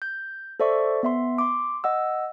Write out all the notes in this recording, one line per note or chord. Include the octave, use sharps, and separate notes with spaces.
G6
A4 C5 D5 E5 C#6
B3 E5 C6
C6 D6
D#5 F#5 E6